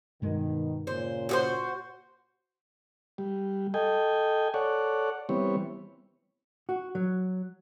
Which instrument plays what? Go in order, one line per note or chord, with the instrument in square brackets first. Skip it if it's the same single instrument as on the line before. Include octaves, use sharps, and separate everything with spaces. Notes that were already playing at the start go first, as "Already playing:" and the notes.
[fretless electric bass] G2 G#3 [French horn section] B2 D#3
[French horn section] A#2 C#3 C#5 [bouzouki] C5
[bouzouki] F#4 G#4 C5
[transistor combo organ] G3
A4 D#5 G5 G#5
A4 C#5 D5 F#5
E3 G3 B3 C4 C#5
[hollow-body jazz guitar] F#4
F#3